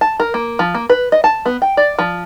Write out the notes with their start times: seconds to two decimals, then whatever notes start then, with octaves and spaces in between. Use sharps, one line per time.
0.01 A5
0.20 A#4
0.34 A#3
0.59 F3
0.75 A#3
0.90 B4
1.12 D#5
1.24 A5
1.46 B3
1.62 G5
1.77 D5
1.99 F3